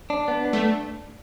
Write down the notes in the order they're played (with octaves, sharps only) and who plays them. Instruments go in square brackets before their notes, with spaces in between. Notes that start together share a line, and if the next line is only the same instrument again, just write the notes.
[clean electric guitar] D4
B3
D4
[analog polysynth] A3